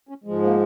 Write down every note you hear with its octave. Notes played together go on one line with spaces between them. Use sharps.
C#4
G#2 F3 G#3
A#3